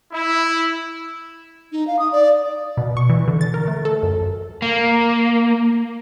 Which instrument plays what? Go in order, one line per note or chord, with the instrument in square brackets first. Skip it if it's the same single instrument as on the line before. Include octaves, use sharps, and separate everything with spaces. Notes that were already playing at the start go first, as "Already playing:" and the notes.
[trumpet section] E4
[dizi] D#4
F5
D#6
D5
[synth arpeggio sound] B2
C#6
E3
D3
A6
A#4
A3
A4
F#2
[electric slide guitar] A#3